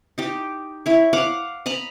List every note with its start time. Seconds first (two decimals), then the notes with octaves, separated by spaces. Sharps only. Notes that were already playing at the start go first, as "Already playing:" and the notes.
0.18 D#4 G4
0.86 E4 C#5
1.13 F5 F#5 D6
1.66 D#5 A#5 B5